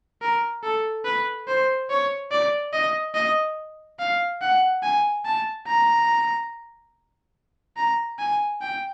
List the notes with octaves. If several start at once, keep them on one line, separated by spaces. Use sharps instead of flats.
A#4
A4
B4
C5
C#5
D5
D#5
D#5
F5
F#5
G#5
A5
A#5
A#5
G#5
G5